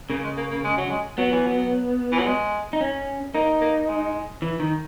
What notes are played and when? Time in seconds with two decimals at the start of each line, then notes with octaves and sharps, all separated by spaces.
0.10 C#3 A#3
0.23 G#3
0.37 A#3
0.51 A#3
0.64 G#3
0.77 F#3
0.90 G#3
1.18 F#3 B3
1.32 E3
1.46 F#3
2.12 E3
2.19 F#3
2.26 G#3
2.73 D#4
2.81 C#4
3.34 A#3 D#4
3.61 A#3
3.88 G#3
4.42 E3
4.60 D#3